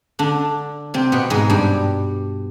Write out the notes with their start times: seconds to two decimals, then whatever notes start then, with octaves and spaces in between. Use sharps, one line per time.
0.19 D3 D4
0.94 C3 C4
1.12 B2 B3
1.30 G#2 G#3
1.50 G2 G3